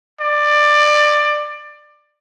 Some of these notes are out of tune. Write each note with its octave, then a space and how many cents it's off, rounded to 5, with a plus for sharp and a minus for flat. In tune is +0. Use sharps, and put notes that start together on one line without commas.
D5 +20